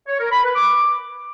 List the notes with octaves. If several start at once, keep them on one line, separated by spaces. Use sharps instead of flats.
C#5
A#4
B5
B4
D6